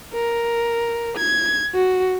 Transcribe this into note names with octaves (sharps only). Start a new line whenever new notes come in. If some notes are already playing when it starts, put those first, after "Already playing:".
A#4
G#6
F#4